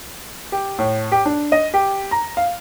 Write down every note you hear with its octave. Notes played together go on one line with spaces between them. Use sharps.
G4
A2
G4
D4
D#5
G4
A#5
F5